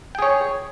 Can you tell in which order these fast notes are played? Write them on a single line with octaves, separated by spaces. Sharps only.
G5 G#4 C#5